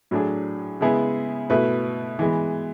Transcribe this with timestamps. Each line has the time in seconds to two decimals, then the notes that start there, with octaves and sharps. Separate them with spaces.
0.11 A2 F#3 A3 D4 G#4
0.81 C#3 G#3 B3 E4 G#4
1.50 B2 A3 E4 B4
2.19 E3 G#3 B3